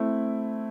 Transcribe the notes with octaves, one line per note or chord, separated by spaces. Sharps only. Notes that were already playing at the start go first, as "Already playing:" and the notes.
Already playing: A3 C4 E4